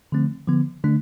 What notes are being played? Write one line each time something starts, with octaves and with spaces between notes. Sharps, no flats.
D3 F3 A3 C4
D3 F3 B3
D3 A3 D4